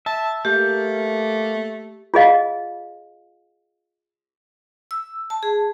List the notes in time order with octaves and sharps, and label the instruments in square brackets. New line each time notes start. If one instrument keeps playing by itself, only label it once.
[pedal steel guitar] E5 [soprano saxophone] A5
[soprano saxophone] A3 [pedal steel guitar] A#3 [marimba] G4
[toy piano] F4 G#4 D#5 F5
[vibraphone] E6
A5
G#4